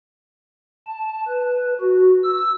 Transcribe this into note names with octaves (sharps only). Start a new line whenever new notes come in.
A5
B4
F#4
E6